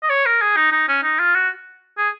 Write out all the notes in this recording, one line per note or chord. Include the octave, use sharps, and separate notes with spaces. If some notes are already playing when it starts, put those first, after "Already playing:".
D#5
C#5
A#4
G#4
D#4
D#4
C#4
D#4
F4
F#4
G#4